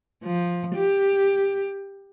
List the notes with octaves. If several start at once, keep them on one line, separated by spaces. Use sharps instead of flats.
F3
G4